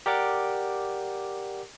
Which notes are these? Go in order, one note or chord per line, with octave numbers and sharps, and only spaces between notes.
G4 A#4 D5 F#5 D6